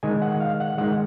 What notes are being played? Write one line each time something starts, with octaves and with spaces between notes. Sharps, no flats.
D#3 G#3 G#5
F#5
F5
F#5
D#3 G#3 F#5